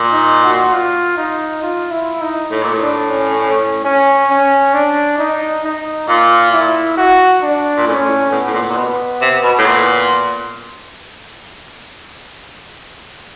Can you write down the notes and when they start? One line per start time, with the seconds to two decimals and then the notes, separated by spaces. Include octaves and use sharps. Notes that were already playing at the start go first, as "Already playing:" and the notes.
Already playing: A#2
0.13 D#4
0.43 F#4
0.73 F4
1.17 D#4
1.62 F4
1.91 E4
2.21 D#4
2.51 A2
2.63 A#2
2.74 A2
2.81 D4
3.10 C#4
3.40 C#4
3.85 C#4
4.30 C#4
4.74 D4
5.19 D#4
5.64 D#4
6.08 A#2 F4
6.52 E4
6.97 F#4
7.42 D4
7.78 A#2
7.87 A2 C#4
8.09 A2
8.31 A2 B3
8.47 A2
8.54 A#2
8.69 A#2
8.76 B2
9.21 C3
9.43 B2
9.58 A2
9.66 A#2